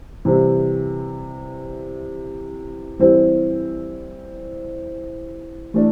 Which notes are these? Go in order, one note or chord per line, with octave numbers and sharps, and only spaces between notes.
C3 E3 G3 C4 E4
E3 G3 C4 E4
E3 A3 D4